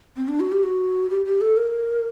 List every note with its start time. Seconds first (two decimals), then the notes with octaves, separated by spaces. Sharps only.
0.17 C4
0.28 D4
0.40 F#4
0.52 G4
0.63 F#4
1.10 G4
1.26 G4
1.41 A4
1.57 A#4